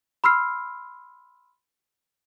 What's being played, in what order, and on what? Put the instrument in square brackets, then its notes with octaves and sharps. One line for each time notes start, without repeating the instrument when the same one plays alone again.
[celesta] B5 C6 E6 F6 C7